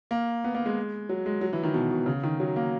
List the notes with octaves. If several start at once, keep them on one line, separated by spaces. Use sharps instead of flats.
A#3
B3
A#3
G#3
F#3
G#3
F#3
E3
D#3
B2
B2
C#3
D#3
F#3
A#3